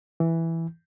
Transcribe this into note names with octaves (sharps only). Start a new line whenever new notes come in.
E3